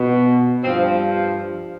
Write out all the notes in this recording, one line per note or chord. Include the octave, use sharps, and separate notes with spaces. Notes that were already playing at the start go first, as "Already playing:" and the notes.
Already playing: B2
G2 F3 C4